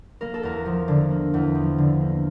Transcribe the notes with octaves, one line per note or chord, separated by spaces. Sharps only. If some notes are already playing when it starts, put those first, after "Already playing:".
A#3 A#4
A4
E2 A#4
F3
D3
A#3
E2
F3
D3
A#3